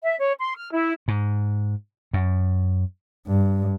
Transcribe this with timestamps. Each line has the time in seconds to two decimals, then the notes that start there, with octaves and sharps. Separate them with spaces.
0.04 E5
0.18 C#5
0.39 C6
0.57 F6
0.72 E4
1.08 G#2
2.13 F#2
3.27 G2